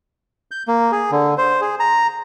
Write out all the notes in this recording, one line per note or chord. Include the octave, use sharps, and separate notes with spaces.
G6
A#3
G#4
D3
C5
G#4
A#5